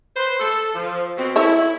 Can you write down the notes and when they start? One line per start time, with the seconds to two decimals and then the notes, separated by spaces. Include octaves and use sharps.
0.17 B4 C5
0.40 A4
0.75 F3
1.17 B2 C4
1.36 E4 A4 C#5 E5